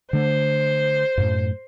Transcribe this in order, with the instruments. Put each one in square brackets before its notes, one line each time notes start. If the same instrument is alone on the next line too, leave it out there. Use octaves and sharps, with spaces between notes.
[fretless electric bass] D3 A3 [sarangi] C5
[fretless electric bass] F#2 A2